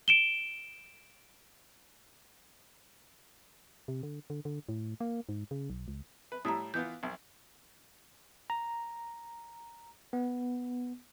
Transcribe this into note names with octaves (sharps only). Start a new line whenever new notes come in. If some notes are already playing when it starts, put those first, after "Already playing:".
D7 E7 G7
C3
D3
D3
D3
A2
A#3
G#2
C#3
B1
C#2
B4
A2 G3 E4 A#5 D#6
E3 B3 F4 G6
B1
A#5
B3